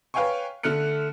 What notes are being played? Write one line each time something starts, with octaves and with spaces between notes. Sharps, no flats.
B4 C#5 F5 G5 G#5 C#6
D3 A3 F6 F#6 C#7